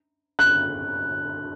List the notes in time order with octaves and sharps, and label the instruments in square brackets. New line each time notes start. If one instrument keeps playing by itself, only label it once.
[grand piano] F#6